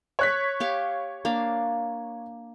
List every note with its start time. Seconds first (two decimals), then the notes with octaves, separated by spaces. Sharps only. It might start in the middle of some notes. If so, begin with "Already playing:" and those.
0.19 C#5 F#6 B6
0.60 G4 F5 C#6
1.25 A#3 D4 F5